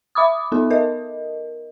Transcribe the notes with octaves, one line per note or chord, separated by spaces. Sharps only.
E5 B5 D6 D#6
B3 D#4 A4
A#4 D#5